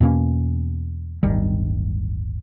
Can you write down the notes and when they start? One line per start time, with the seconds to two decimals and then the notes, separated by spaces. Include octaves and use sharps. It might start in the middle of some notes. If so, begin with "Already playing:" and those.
0.01 E2 B2 A#3 C#4
1.23 D1 G1 D#3 G3